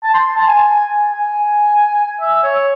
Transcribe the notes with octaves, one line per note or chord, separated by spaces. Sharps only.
A5
C6
A5
G#5
G#5
E5
C#5